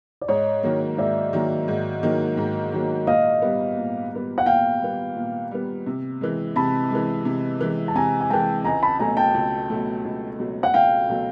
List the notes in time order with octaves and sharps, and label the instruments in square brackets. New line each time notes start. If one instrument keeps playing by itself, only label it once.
[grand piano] D5
[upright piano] G#2 [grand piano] C#5 D#5
[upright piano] D#3 F#3 A#3
[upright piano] G#2 [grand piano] D5 E5
[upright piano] D#3 F#3 A#3
G#2
D#3 F#3 A#3
G#2
D#3 F#3 A#3
[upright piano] A#2 [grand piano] D#5 F5
[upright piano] G3 B3
A#2
G3 B3
[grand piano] F#5
[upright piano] A#2 [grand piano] F5 G5
[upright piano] G3 B3
A#2
G3 B3
C3
E3 G#3
[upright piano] C3 [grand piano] A5 B5
[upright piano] E3 G#3
C3
E3 G#3
[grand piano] A5
[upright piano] C3 [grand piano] G#5 A#5
[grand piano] G#5
[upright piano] E3 G#3 [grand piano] G5 A5
[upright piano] C#2 [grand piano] G#5 A#5
[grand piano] A5 B5
[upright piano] B2 F#3 A3 [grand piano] G#5 A#5
[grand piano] G5 A5
[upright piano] C#2
B2 F#3 A3
C#2
B2 F#3 A3
[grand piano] F#5
[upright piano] C#2 [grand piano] F5 G5
[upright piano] B2 F#3 A3